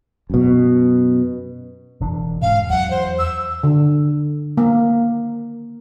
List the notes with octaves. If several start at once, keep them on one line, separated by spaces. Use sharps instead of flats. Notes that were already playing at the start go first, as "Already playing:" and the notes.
F#2 B2
E1 E3 D4
E1 G#2 C#4 F5
E2 F#3 F#5
C5
E6
D3
A#3